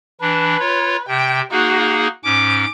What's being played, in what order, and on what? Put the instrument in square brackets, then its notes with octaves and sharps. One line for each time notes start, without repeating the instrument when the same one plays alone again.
[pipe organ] E3 D4 [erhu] B4
[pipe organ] F4 C#5
[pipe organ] C3 [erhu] G5
[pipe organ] A#3 D#4 G#4 [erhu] F#4
[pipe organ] G#2 C#4 [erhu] D6